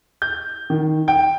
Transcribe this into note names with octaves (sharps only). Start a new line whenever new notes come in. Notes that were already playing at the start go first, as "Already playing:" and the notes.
G6
D#3
G5